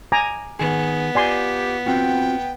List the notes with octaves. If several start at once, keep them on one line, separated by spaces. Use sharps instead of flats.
G#5 A#5 D6
D#3 B3 G#4
F4 G4 D5 G#5 C6
C4 F4 F#4 G5